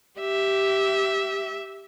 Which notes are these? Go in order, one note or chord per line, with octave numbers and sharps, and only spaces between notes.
G4 E5